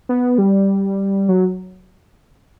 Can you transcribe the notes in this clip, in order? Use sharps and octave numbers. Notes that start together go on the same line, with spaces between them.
B3
G3
F#3